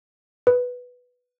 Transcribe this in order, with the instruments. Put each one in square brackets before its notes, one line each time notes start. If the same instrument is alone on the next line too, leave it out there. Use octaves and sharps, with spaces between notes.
[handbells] B4